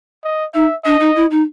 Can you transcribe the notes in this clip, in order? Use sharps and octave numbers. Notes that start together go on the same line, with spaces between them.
D#5
D#4 E5
D4 D#5
D#4
E4
D#4